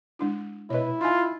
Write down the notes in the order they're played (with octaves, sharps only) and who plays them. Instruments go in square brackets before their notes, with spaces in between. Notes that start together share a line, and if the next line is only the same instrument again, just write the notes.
[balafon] G#3 D4 E4
[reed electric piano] B2 B4 [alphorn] E4 [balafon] C#5 D#5
[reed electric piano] D#4 [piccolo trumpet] F4 [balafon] G#5 B5 C6